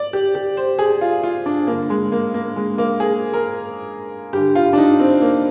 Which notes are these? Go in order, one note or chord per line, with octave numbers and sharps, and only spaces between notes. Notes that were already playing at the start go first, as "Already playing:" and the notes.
Already playing: D5
G4
G4
C5
G#4
F4
F4
D4
G2 D3 A#3
G#3
A#3
A#3
G#3
A#3
G#4
A#4
G2 D3 G4
F4
D4
D#4
C4
A#3